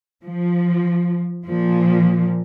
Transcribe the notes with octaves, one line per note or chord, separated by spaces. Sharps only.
F3
A#2 F3